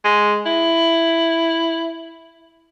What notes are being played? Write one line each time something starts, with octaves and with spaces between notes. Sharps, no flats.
G#3
E4